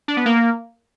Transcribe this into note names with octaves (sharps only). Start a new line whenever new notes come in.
D4
B3
A#3